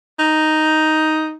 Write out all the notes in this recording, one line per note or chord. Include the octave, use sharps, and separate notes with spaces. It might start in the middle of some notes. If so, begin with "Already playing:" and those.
D#4